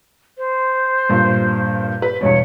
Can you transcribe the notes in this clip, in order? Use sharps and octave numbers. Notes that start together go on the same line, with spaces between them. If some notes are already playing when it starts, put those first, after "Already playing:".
C5
G2 A#2
B4
E2 G2 B2 C#5